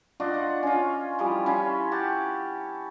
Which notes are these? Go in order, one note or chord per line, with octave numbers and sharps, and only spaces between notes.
D4 F4 F#4 D#5
F#5
C#4 F4
E3 F3 G3
C#4 E4 F4
G4 F#5 A5